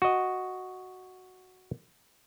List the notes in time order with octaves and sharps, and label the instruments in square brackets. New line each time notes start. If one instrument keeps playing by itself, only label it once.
[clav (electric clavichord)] F#4 D#5